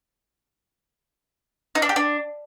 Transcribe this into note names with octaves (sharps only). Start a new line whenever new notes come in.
D#4
D4
G4
D4